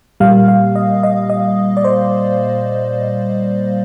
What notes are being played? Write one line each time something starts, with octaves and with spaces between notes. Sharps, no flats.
A#2 G3 A#3 F5
F5
D#5
D#5
D#5
D5
C5